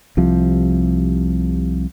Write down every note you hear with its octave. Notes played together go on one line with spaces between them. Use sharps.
C2 C3 F3